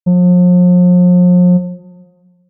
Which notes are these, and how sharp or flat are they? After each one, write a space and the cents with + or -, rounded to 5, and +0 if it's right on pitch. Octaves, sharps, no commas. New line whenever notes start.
F3 +40